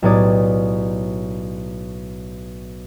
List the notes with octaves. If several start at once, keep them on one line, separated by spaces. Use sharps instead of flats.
B1 A2 G4 C#5 D5 D#6